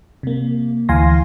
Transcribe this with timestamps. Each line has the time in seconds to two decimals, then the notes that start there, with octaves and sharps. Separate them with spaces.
0.23 C3 A#3
0.89 D2 E3 F5 G#5 C6 A#6